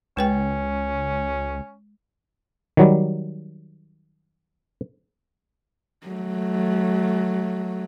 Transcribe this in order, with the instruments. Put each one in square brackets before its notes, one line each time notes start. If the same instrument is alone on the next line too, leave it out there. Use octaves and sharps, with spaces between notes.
[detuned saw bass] C#2 [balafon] G#3 B4 G5 [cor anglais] C#4
[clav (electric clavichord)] D#3 F#3 G3
[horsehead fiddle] F#3 A3